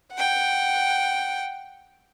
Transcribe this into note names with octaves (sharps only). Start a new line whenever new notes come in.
F#5 G5